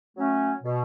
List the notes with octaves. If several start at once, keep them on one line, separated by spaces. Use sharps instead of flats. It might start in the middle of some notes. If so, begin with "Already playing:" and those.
F#3 A3 C#4
B2